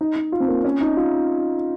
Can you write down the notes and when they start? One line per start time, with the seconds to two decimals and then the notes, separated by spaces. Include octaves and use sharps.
0.01 D#4
0.16 D#4
0.32 F4
0.40 C4
0.48 A#3
0.64 C#4
0.81 D#4
0.97 F4